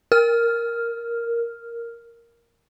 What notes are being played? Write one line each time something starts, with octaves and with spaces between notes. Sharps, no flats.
A#4 F6